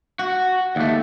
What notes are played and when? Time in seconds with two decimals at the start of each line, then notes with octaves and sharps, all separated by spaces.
0.19 F#4
0.76 D#2 A3